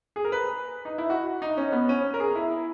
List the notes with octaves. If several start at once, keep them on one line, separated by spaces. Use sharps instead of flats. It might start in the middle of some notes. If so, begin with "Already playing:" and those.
G#4
A#4
B4
D#4
E4
F#4
D#4
C#4
B3
C#4
A#4
G#4
E4